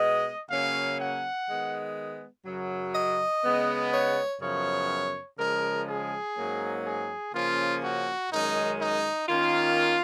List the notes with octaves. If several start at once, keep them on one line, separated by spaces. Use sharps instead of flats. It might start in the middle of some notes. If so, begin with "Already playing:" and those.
Already playing: B2 G#3 B3 D#5
C#3 F#3 A#3 C#4 F5
F#5
D#3 G#3 B3
F#2 C#3 F#3
D#5
C#3 G#3 B3
C#5
F#2 C#3 F3 B3 C#5
C#3 F3 G#3 A#4
G#4
G#2 F#3 A#3 C#4
G#4
C#3 F3 A#3 C#4 F4
F#4
F#2 D#3 G#3 C#4 D#4
D#4
D#3 A#3 C#4 F4